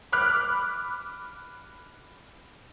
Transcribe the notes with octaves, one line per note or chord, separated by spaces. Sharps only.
B5 D6 F6 F#6